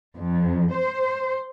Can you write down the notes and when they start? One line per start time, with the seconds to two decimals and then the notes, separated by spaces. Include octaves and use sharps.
0.15 F2
0.72 C5